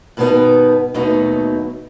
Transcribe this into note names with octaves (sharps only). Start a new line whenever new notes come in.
G2 B2 D#3 G3 B3 D#4
D#2 B2 F#3 A3 B3 D#4